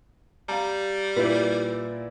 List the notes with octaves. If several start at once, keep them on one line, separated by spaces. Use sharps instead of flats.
G3 F5 A#5
A#2 E4 B4 D5